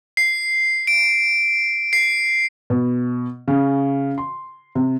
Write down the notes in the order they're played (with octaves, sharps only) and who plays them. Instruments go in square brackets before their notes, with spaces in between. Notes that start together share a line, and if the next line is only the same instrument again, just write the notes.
[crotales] C7
D7
C7
[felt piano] B2
C#3
C6
C3